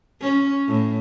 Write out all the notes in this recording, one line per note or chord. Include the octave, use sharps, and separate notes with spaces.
C#4
A2